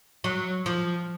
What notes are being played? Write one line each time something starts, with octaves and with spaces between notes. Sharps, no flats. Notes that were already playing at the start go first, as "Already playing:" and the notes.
F#3
F3